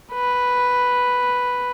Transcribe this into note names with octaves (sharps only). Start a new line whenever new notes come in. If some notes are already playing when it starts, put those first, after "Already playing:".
B4